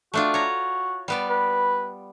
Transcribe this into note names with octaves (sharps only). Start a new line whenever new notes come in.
A3 D4 F4 F#4
C#5 A#5
G3 B3 D5
B4